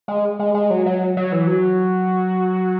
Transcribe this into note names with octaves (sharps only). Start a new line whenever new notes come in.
G#3
G#3
G#3
F#3
F#3
F#3
E3
F#3